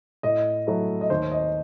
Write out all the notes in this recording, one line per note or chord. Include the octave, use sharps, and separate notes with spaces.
A2 D#5
F#3 A3 E4
D#5
D#2 C5
D#5